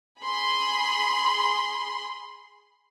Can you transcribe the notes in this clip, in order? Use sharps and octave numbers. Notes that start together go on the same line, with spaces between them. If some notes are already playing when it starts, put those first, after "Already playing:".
G#4 B5 C6